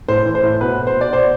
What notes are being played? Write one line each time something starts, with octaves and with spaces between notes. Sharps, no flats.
A2 C5
E3
C5
A2
B2 B4
B2
C5
B2
D5
B2 C5